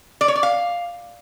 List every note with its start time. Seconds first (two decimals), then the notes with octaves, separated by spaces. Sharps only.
0.21 D5
0.28 C#5
0.36 D5
0.43 F5